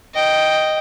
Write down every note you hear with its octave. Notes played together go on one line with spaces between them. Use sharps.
D#5 G5